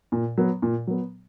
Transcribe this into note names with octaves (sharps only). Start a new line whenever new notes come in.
A#2
F#3 B3
A#2
F#3 B3